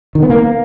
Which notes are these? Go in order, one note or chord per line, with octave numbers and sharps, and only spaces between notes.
D#3
B3
A#3